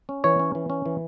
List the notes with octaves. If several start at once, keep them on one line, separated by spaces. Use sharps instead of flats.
C#4
E3 C#5
C#4
E3
C#4
E3